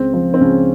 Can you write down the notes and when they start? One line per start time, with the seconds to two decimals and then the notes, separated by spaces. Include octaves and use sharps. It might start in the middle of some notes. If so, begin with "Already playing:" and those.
Already playing: C#2 C4
0.13 F3
0.34 C4
0.41 C#2 C#4